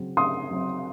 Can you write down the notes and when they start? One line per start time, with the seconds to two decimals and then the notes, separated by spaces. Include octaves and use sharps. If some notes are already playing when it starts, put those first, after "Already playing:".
Already playing: C#3 F#3 C4
0.17 C#3 C6 D#6
0.51 F#3 C4